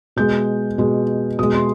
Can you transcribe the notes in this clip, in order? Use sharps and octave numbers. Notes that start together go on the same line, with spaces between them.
B2 G#3 G6
B2 G#3
B2 G#3 D#6
C6